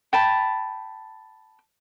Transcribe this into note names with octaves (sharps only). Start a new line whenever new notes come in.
G5 A5 B5